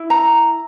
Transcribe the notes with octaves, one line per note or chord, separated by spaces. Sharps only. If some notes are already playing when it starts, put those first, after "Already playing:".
Already playing: E4
A#5